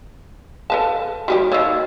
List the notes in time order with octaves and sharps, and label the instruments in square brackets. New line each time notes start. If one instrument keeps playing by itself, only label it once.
[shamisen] A4 B4 A5 [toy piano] F5
[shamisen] G3 C#4 G4 [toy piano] F#4
[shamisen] D#3 A#3 [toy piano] D5 D#5 E6